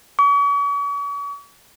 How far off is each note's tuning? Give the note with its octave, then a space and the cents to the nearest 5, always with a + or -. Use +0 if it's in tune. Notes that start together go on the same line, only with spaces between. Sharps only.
C#6 +45